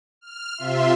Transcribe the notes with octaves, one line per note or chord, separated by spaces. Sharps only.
F6
C3 F4 E5 C6